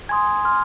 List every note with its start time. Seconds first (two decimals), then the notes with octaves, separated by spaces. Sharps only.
0.09 G#5 C6 D#6 G#6
0.45 C6 F6